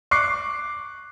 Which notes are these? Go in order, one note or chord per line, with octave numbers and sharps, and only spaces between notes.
C#6 D6 F#6 C7